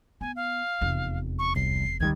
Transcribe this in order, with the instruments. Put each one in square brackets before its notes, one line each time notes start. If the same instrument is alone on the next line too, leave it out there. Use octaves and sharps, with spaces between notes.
[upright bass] B3 [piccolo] G#5
[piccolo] F5
[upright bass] F1 E2
[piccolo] C#6
[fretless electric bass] C2 [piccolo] C7
[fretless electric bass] D2 D#3 G3 [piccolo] G#6